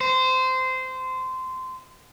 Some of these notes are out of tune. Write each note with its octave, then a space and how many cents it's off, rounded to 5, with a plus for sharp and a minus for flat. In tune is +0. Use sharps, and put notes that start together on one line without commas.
C5 -20